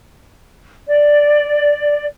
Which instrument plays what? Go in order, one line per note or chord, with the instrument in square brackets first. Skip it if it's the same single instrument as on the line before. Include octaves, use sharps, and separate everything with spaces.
[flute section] D5